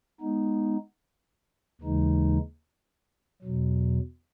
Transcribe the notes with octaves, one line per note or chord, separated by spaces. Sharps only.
G#3 B3 D#4
D#2 C#3 E3 G#3 D#4
E2 B2 F#3